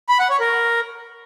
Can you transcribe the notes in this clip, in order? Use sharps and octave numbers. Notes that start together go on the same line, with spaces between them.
B5
F#5
C#5
A#4